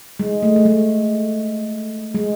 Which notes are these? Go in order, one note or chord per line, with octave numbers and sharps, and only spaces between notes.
G#3
A3
A3
G#3
G#3